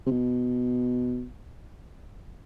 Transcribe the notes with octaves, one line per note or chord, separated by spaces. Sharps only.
C3
B2